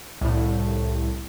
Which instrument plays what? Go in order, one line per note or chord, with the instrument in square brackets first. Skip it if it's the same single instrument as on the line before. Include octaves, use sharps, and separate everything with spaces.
[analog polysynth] C2 A2